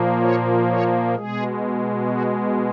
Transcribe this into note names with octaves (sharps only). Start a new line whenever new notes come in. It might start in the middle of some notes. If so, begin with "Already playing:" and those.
Already playing: A#2 F3 A#3
C#5
C#5
B2 G#3 G#4
F#4